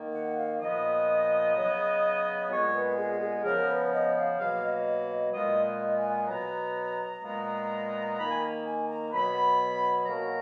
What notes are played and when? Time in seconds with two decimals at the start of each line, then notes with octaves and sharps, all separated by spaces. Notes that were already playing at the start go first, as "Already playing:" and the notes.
Already playing: D#3 A#3
0.13 F#5
0.37 F5
0.60 A#2 F3 B3 D#5
1.55 C#3 F#3 B3
2.49 A#2 G#3 B3 C#5
2.74 B4
2.96 G#4
3.20 G#4
3.43 C#3 F3 B3 A#4
3.68 B4
3.92 D#5
4.15 F5
4.38 B2 F#3 A#3 F5
4.63 D#5
4.86 D#5
5.09 D#5
5.32 A#2 G#3 B3 D#5
5.65 D#5
5.97 G#5
6.28 B2 F#3 B3 A#5
7.22 A#2 G#3 B3
8.16 D#3 A#3 B5
8.31 G#5
8.40 A#5
8.64 G#5
8.87 A#5
9.11 B2 F#3 B3 B5
10.05 B2 F#3 A#3 A#5